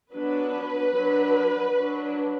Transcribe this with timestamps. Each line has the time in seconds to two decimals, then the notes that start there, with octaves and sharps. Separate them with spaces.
0.14 F#3 B3 D4 B4
0.95 F#3 D4
1.76 F#3 D4